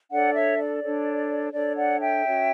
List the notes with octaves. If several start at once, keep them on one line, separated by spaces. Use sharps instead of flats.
D4 A4 C#5 D5 F#5
C#5 E5
D5
D4 A4 C#5
D4 A4 C#5 D5
D5 F#5
E5 G5
C#4 F#4 C#5